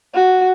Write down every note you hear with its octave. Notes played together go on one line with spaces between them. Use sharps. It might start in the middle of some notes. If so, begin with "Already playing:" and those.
F#4